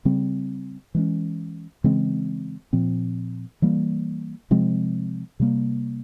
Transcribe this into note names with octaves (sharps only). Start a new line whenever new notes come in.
C#3 G3 C4
E3 G#3 C#4
C#3 E3 G#3 C4
A#2 F3 C4
E3 G3 A#3
C3 F3 G#3 C4
C3 G3 A#3